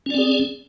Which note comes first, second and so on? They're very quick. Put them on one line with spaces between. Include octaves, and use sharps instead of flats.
C#4 D5 C4 G#4